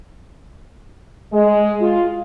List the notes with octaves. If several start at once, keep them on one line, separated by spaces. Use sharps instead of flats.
G#3
F4